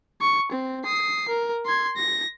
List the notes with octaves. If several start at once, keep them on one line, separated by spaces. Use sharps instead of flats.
C#6
C4
D#6 C7
A#4
C6 G#6
A#6